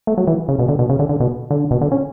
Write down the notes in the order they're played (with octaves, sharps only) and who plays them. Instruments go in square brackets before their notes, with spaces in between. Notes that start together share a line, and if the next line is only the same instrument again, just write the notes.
[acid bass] A3
F#3
E3
C#3
B2
D3
B2
C#3
D3
D3
B2
D3
B2
D3
C#4